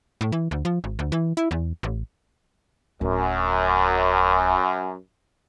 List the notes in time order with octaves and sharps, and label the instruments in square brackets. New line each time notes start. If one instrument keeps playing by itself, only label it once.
[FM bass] A2
E3
D2
F3
G#1
D2
E3
E4
E2
A1
[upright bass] D1 [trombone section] F#2